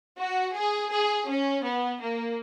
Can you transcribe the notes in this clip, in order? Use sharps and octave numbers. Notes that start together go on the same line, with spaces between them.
F#4
G#4
G#4
C#4
B3
A#3